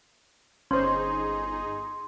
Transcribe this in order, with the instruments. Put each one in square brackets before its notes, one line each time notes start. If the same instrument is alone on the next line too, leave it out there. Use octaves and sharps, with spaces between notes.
[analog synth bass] G1 [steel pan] C#4 C5 [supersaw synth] D#4 G#4 [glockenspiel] C6